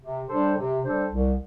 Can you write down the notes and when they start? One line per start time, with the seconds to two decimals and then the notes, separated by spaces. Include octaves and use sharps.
0.02 C3
0.29 G3 D4 A4 C5
0.57 C3
0.83 G3 D4 A4 C5
1.11 C2